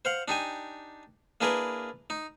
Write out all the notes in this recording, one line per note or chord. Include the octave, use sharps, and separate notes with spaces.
C5 F5 F#5
D4 D#4 G4 G#5
A#3 D4 E4 G#4 A#4 B4
D#4